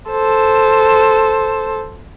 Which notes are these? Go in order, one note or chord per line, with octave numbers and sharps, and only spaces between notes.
A4 C5